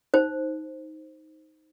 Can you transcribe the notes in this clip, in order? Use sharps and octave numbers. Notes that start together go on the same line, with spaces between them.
D#4 C5